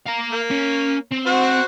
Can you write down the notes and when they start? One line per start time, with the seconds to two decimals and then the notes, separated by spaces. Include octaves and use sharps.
0.07 F5 A#5
0.32 A#3
0.51 C#4
1.11 C4
1.26 F#4 C5 F#5